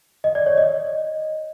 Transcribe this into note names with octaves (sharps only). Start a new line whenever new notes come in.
D#5
D5
C#5
D#5